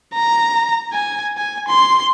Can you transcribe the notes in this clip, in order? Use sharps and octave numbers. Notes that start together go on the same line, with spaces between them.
A#5
G#5
G#5
C6